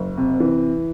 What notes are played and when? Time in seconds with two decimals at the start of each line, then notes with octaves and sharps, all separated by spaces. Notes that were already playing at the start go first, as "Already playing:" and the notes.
Already playing: F#1
0.17 C3
0.40 E3